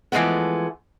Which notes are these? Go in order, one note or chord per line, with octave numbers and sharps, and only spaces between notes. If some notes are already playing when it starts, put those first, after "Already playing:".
E3 F3 G#3 A3 B3